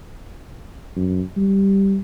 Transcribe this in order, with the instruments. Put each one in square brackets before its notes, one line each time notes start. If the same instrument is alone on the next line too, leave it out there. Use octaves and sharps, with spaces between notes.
[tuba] F#2
G3